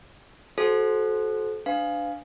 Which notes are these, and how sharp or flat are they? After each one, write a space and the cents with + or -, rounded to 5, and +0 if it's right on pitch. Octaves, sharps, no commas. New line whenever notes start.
F#4 +0 A4 -30 C5 +0
D4 +0 B4 +40 F5 +0